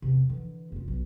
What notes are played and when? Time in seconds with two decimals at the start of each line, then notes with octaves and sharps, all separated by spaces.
0.02 E2 C3
0.29 D3 E3
0.72 F1 F4
0.88 B1